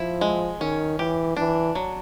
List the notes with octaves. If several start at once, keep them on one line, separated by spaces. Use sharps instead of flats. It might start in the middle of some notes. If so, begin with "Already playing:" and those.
Already playing: F3 E4
G#3
D#3 C#4
E3 G4
E3 D4
F#3